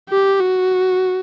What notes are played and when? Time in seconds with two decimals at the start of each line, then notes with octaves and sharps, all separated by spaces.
0.10 G4
0.40 F#4